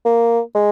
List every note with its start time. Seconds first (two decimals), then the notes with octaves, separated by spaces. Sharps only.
0.05 A#3
0.55 G#3